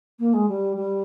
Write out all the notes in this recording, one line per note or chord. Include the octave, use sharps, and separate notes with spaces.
A#3
G#3
G3
G3